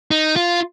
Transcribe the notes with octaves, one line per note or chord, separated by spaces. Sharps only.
D#4
F4